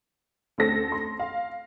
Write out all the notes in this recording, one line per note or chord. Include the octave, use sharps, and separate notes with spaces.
D2 C4 C#4 A4 A#6
C6
F5